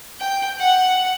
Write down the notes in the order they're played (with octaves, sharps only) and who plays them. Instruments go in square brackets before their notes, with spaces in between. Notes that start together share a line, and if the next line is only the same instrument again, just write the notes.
[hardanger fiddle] G5
F#5